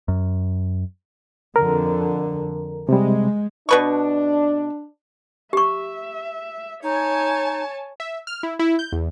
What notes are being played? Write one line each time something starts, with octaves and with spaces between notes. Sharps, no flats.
F#2
F2 D3 A#4
C3 G3 G#3
B2 D4 B4 C#6
G4 E5 C#6
D#4 C#5 G#5 A5
E5
F6
E4
E4
G6
E2